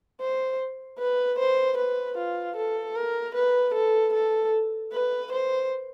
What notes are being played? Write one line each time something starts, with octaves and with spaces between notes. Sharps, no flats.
C5
B4
C5
B4
F4
A4
A#4
B4
A4
A4
B4
C5